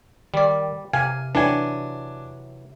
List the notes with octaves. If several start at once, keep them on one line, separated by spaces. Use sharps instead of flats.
D#3 G3 D5
C3 F5 G#5
E3 F#3 D4 G#5